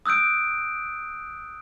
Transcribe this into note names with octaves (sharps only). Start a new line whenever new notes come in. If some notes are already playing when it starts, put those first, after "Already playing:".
D#6 E6 F#6 G6 D7